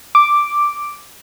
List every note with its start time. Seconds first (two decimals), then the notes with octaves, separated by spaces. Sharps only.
0.15 D6